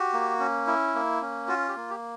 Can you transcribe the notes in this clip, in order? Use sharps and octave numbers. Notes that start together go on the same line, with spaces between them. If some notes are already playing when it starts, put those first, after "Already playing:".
Already playing: F#4 G4
A#3
C#4
E4
A#3
C#4
F4 F#4
G4
A#3
G4